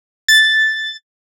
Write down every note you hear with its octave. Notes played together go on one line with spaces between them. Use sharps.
A6